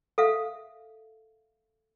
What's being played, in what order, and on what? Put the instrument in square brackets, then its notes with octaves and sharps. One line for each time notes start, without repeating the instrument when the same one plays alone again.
[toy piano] A4 E5 F5